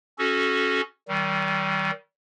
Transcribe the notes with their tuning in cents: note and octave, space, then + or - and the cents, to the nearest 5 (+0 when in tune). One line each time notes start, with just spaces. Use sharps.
C#4 +0 F#4 +0 A4 -25
D#3 +15 G3 -35